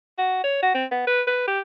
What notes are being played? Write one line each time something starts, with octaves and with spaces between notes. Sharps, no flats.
F#4
C#5
F#4
C4
B3
B4
B4
G4